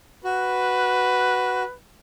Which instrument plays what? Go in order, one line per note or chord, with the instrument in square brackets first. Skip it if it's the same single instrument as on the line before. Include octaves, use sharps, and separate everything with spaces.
[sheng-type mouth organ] F#4 [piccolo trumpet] B4